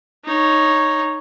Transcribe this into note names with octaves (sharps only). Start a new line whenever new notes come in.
D#4 C#5